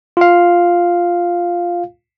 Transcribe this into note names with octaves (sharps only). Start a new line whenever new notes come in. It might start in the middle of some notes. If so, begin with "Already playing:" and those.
F4 F5